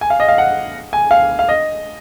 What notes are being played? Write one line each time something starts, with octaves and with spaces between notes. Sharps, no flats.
G#5
F5
D#5
F5
F#5
G#5
F5
F5
D#5